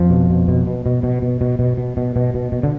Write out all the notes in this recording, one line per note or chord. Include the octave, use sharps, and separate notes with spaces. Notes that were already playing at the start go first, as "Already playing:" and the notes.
Already playing: F2 F3
B2
B2
B2
B2
B2
B2
B2
B2
B2
B2
B2
B2
B2
B2
D3